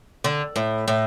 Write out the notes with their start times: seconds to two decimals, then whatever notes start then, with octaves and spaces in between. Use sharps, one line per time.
0.24 D3
0.56 A2
0.88 A2